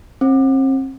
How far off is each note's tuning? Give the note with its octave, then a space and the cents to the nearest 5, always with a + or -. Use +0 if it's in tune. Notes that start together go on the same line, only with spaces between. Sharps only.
C4 +40